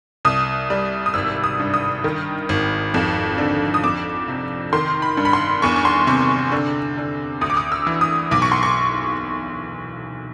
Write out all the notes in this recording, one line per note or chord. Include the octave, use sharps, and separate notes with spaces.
C2 D#6
G3
D#6
G#1 E6
D#6
G2
D#6
D#3
G#1
F2
D3
D#6
F2 D6
C3
D#3 C6
B5
G2
B5
C6
E2 C#6
C#6
C6
C3 C#6
D3
D3
D2 D#6
D6
D#6
E6
E3
D#6
B1 D6
C#6
C6
C#6